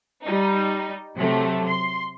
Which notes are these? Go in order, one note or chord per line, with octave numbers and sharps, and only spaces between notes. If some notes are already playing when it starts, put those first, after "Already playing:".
G3 D#4
C3 F#3 A3
C6